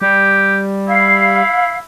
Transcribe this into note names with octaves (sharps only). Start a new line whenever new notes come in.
G3 G4
E4 F5